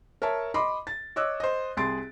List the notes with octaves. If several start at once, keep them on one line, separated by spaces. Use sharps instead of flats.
A#4 C#5 E5 A5
D#5 B5 C6 D6
A6
C#5 D#5 D6 E6 F#6
C5 D#5
C2 G#4 C6 A6 D7